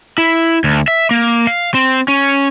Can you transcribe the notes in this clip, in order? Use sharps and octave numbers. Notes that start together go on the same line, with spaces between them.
E4
D2
E5
A#3
F5
C4
C#4